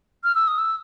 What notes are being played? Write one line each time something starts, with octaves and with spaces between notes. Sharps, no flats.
F6
E6
D#6
E6